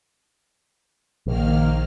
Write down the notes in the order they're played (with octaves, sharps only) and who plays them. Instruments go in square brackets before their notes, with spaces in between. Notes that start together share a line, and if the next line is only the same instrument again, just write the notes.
[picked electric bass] A#1 [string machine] D#3 A#3 F6